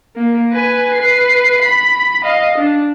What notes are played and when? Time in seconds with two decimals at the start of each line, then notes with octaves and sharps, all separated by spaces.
0.16 A#3
0.53 B4 G#5
0.95 B4 C7
1.62 B5
2.23 D#5 F5
2.58 D4